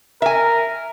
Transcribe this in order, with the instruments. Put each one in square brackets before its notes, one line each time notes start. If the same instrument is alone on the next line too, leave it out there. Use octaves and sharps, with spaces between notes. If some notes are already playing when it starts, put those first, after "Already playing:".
[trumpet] A#4 [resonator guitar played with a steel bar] E5 G#5